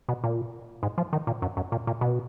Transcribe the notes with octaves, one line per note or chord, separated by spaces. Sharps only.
B2
A#2
G#2
F3
D#3
A#2
F#2
F#2
A#2
A#2
B2